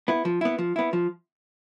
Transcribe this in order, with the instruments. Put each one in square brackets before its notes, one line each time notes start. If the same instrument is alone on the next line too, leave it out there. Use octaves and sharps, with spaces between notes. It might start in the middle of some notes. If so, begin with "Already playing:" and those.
[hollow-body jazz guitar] B3 E4
F3
B3 E4
F3
B3 E4
F3